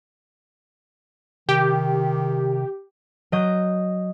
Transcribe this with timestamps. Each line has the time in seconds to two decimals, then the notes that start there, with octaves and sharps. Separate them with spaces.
1.49 C3 D#3 G4
3.32 F#3 D#5 G6